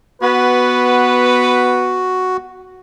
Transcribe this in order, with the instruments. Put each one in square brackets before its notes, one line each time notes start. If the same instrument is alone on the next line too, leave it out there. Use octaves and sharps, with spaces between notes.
[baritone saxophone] B3 [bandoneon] F#4 [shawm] B4